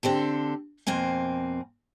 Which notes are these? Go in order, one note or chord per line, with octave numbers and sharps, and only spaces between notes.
D3 C4 G4 A4
F2 B2 A#3 C4 G#5